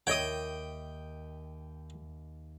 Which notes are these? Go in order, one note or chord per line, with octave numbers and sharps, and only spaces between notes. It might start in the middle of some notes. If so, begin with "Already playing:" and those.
D#2 C#5 D#5 E5 G5 D#6